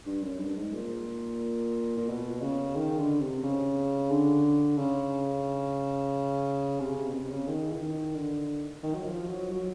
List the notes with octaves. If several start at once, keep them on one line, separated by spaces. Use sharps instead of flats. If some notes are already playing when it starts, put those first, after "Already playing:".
G2
F#2
G2
G#2
A#2
A#2
B2
C#3
D#3
D3
C3
C#3
D3
C#3
C3
C3
B2
C3
C#3
D#3
E3
D#3
D3
D#3
F#3
F3
F#3
F#3